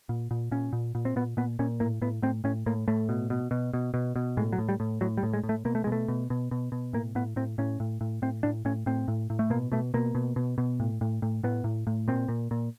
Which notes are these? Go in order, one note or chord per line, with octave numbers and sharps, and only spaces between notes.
A#2
A#2
A#2 C#4
A#2
A#2
C4
A#2 B3
A#2 B3
A#2 C#4
A2 A#3
A2 B3
A2 C4
A2 C#4
A2 A#3
A2 A3
B2
B2
B2
B2
B2
B2
A2 G#3
F#3
A2
G3
A2
A2 F#3
G3
A2
G#3
A2
A3
B2 A#3
A3
G#3
B2
A3
B2
B2
B2
B2
A2 A#3
A2 B3
A2 C4
A2 C#4
A2
A2
A2 C4
A2 D4
A2 C#4
A2 C4
A2
A2
A3
B2 A#3
B2 A3
B2 A#3
B2
B2
B2
A2
A2
A2
A2 B3
A2
A2
A#2 C4
A#2
A#2